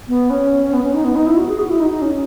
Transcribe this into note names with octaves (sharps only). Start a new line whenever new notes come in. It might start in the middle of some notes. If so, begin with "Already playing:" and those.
B3
C#4
B3
C#4
D#4
B3
D#4
E4
F#4
G#4
F#4
E4
D#4
D#4
C#4